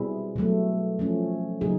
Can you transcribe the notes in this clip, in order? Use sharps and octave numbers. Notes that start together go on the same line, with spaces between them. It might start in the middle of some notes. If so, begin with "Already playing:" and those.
Already playing: B2 G3 C4 E4 G#4
B2 F#3 A3
F3 A3 C#4
C#3 F#3 A#3 D#4 G#4